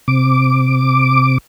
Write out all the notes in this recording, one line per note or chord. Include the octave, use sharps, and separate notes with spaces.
C3 D6